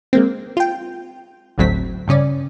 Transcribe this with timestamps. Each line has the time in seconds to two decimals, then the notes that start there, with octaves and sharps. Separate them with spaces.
0.13 G#3 A#3 C4
0.57 F4 G5
1.58 G1 D2 A2 F#3 C4 B6
2.08 G2 C#3 C#4 D5